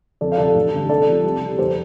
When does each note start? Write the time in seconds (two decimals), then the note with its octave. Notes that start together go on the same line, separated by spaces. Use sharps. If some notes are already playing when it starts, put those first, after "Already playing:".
0.21 F2 A4 D5
0.32 F5
0.38 C3 F3 A4 D5
0.55 A1
0.72 G2 D3 G3
0.89 C2 A4 D5
1.07 C3 F3
1.24 C2
1.41 C3 G3
1.58 F1 G4 C5